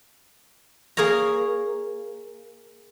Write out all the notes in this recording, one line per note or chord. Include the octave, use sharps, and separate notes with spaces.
A#3 G#4 A#4 C#5 A#5